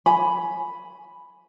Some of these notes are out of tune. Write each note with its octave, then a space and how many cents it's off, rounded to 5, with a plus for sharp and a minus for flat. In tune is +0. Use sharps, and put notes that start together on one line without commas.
G#5 +15 B5 +0